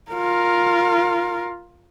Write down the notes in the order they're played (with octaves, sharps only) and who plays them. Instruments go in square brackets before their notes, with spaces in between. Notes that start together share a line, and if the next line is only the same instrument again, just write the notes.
[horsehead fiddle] F4 A#4